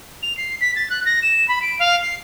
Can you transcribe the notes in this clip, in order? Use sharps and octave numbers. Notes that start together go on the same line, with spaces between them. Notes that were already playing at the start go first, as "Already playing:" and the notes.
F7
C7
B6
A6
F#6
A#6
E7
B5
D7
F5
C7